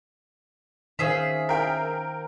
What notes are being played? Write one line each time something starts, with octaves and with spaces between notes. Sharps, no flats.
D#3 C#4 G#4 C5 E5 F5
A#4 G5